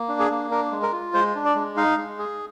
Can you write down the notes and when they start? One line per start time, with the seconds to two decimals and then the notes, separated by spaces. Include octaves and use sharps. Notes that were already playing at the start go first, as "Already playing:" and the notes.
Already playing: A#3
0.08 D4
0.19 G#4
0.31 A#3
0.51 D4 A#4
0.71 G#3
0.83 A#4
0.92 F4
1.14 G#3 C5
1.35 D4
1.45 D5
1.55 G#3
1.77 D#4 F5
1.97 G#3
2.19 G#4